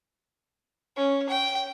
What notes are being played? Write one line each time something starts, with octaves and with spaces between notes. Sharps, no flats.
C#4
G5